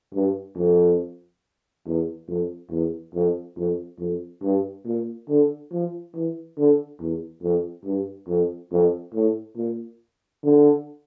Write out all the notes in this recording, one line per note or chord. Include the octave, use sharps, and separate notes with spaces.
G2
F2
E2
F2
E2
F2
F2
F2
G2
A#2
D3
F3
E3
D3
E2
F2
G2
F2
F2
A2
A#2
D3